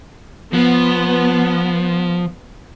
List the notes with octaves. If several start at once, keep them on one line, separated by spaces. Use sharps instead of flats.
F3 B3